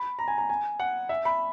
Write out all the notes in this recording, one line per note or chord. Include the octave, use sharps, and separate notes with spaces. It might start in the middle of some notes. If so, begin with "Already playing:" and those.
Already playing: B5
A#5
G#5
A#5
G#5
F#5
E5
B5